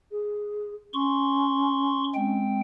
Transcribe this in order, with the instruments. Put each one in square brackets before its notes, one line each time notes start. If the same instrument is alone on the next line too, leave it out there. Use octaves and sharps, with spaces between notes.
[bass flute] G#4
[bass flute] C#4 [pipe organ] C6 C#6
[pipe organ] G#3 C4 G5